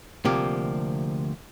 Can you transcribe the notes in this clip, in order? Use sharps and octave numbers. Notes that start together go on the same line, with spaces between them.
D2 C3 F3 A#3 G4